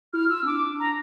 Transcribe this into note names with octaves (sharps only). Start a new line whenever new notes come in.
E4 F6
F4 E6
C4
D4 D6
A#5